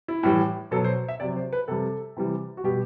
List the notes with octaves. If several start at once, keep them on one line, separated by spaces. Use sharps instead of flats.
E4
A2 E3 G3
B2 F#3 A4
C5
E5
C3 F#3 D5
C5
B4
C3 G3 A4
C3 E3 G3
F#4
B2 G3 G4